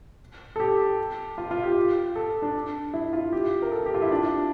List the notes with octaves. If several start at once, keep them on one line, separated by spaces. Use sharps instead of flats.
A4
G4
F4
F4
G4
A4
D4
E4
F4
G4
A#4
A4
G4
F4
E4
D4